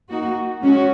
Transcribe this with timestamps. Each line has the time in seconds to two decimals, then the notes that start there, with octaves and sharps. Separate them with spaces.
0.09 A#3 D#4 F#4
0.62 G#3 C#4 F#4